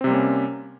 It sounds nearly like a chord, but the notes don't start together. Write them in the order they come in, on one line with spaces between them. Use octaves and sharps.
C4 C3 G3 A#3 C#4